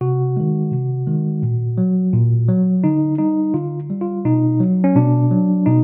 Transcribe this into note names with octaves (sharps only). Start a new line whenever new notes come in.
C3 F#4
D#3 G#3
C3
D#3 G#3
A#2
F#3
A#2
F#3
D3 D#4
G3 D#4
D3 F4
G3
F4
B2 D#4
F#3
C#4
B2 D4
F#3
B2 D#4